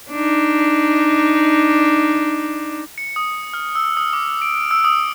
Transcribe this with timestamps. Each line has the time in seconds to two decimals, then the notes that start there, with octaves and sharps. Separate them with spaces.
0.11 D4 D#4
2.98 C#7
3.16 D#6
3.54 F6
3.75 E6
3.97 D#6
4.13 D6
4.42 D7
4.54 D7
4.71 E6
4.85 D#6